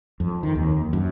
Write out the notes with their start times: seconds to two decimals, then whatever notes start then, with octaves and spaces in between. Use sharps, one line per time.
0.20 F2
0.43 D#3
0.55 D#2
0.93 F#2